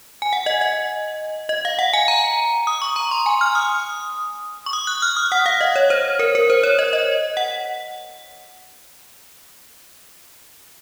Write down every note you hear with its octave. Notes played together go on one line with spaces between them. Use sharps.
G#5
F#5
D#5
D#5
D#5
F5
F#5
G#5
A#5
D#6
C#6
A#5
C6
G#5
F6
D#6
C#6
D#6
F#6
F6
D#6
F#5
F5
D#5
C#5
C5
A#4
A#4
C5
C#5
D#5
D#5
F#5